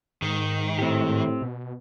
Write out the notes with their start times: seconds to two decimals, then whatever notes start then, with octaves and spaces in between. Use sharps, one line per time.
0.22 G#2 D#3
0.79 A2 C4 G4
1.42 B2